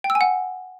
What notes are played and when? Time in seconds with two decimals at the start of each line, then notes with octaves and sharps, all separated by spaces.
0.04 G5
0.10 E6
0.15 G#5
0.21 F#5